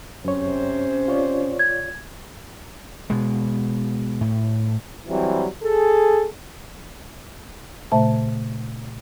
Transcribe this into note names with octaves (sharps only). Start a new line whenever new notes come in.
F#2 C3 C#4 C5 C#5
F4 C#5 D5
G#6
B2 G#3
A2
E3 F#3 G3 C4
G#4 A4
A#2 C#3 A3 C5 E5 A5